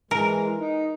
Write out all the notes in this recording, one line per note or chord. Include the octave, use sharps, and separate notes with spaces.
E3 G#3 A#4
D#4